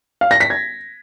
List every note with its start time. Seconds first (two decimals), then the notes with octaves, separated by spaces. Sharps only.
0.21 F5
0.31 A#6
0.40 B6
0.50 G#6